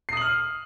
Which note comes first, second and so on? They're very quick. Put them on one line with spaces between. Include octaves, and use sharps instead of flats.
C7 D#6 F#7 F6